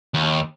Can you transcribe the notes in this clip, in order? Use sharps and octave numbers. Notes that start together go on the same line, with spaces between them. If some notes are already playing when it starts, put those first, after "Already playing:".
D#2